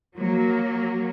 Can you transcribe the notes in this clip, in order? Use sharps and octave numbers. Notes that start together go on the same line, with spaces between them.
F#3 A#3